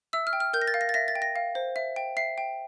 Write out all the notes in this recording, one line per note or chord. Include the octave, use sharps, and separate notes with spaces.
E5 E6
F6
G5
F6
A#4 G6
A#6
A6
F5
A#6
A6
E5 A#6
A6
G5
A#6
F5
C5
E5
G5
E5 C7
G5